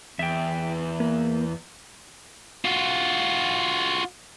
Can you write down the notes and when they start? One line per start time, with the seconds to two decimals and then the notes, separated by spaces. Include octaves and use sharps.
0.19 E2 E5 G5
1.00 A#3
2.65 F4 F#4